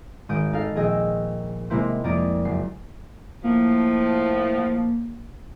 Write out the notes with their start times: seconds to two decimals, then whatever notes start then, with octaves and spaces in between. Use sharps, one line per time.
0.29 G#1 D#6 G6 D7
0.53 D#4 A4 F5
0.75 A#1 G#4 D#5 G5 E6
1.70 C3 G#3 A#3 E4 C5
2.04 F2 A#3 D5 A#5 D#6 D7
2.45 F#1 C7
3.44 A2 F3 A#3